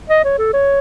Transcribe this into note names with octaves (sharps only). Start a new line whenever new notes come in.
D#5
C#5
A4
C#5